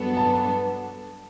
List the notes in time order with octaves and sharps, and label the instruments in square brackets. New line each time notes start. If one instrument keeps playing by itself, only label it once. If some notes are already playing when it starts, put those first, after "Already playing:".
Already playing: [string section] G2 F#3 B3 D4 A4
[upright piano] A5